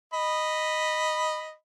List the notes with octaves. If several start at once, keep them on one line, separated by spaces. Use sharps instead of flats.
D#5 B5